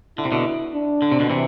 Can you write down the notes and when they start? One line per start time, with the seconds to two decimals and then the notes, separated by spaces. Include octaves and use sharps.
0.18 D3 E4
0.25 C3
0.32 B2 D3
0.74 D4
1.02 D3
1.12 C3
1.20 B2 D3
1.30 C3 E3